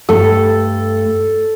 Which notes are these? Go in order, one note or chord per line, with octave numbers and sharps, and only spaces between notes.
G2 A3 A4